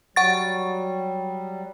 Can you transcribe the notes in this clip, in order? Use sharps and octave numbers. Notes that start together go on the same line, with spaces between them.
F#3 G3 F#5 C#6 A6